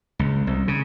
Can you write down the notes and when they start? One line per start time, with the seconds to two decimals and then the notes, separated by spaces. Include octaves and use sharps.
0.19 C#2
0.47 C2
0.68 C#3